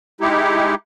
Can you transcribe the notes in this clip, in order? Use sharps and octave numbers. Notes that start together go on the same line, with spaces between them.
G#3 D#4 E4 G4